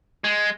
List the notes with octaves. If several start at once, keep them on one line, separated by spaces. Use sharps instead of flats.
G#3